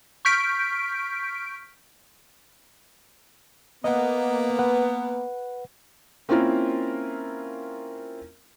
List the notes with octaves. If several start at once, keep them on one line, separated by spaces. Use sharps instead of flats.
C#6 F6 G6 B6 D7
A#3 B3 D#5 F#5
B4 F#5
A#3 C4 C#4 E4 F4 A#4